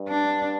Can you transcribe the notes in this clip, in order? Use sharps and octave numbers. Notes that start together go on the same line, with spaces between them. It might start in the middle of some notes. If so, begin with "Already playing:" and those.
Already playing: G2
D4